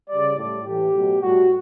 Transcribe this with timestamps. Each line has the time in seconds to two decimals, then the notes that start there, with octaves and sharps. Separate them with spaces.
0.09 C#3 G3 D5
0.37 A2 G3 D5
0.65 A2 E3 A3 G4
0.94 B2 F#3 A3
1.22 A2 G3 F#4